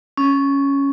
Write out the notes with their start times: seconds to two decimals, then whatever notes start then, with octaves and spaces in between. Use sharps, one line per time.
0.18 C#4